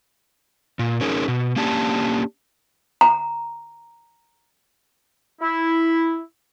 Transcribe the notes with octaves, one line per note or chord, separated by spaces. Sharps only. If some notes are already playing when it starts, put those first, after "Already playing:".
A#2
C#4 D#4 G#4 A#4
B2
A#3 C#4 D4 G4 A5
A#5
E4